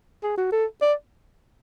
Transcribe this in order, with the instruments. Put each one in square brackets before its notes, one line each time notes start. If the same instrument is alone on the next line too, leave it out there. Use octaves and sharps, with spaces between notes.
[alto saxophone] G#4
F#4
A4
D5